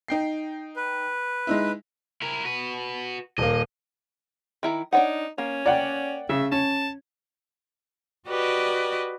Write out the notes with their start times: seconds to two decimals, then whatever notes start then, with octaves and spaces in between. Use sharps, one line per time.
0.08 D#4 G5 C7
0.76 B4
1.47 G#3 D#4 E4
2.22 E4 A#4
2.45 F#4 B4
3.38 D#1 A#3 D#5
4.63 D#3 E4 A#5
4.93 D4 D#4 C#5 F#5
5.38 A#3 C#4
5.66 A#3 D5 F#5 G5
6.29 C#3 E5
6.52 C#4 A5
8.28 F#4 G4 B4 D5 D#5